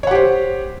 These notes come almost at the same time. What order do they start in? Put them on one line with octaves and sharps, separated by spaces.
C#5 F#5 G4 C5